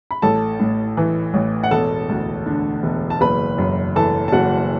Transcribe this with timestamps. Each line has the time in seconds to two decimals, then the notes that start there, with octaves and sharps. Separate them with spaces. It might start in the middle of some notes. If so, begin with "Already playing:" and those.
0.11 B5
0.22 A1 A4 A5
0.60 A2
0.97 E3
1.34 A1
1.63 F#5
1.71 E1 A4 A5
2.09 D2
2.46 D3
2.83 E1
3.10 A5
3.21 F#1 B4 B5
3.58 F#2
3.96 E3 A4 A5
4.28 A5
4.32 F#1 F#4 F#5